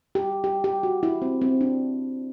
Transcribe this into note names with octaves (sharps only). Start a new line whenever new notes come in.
G4
G4
G4
F#4
E4
C4
C4
D4